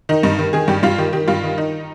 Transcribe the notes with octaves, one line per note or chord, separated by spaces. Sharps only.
D#3 D#4
G2 D#4
D#3
D#3 G#4
G2 G4
G2 F4
D#3 G4
D#3 G4
G2 F4
D#3
D#3 D#4